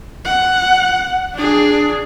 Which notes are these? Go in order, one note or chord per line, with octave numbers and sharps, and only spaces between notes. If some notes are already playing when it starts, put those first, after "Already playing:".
F#5
D4 G#4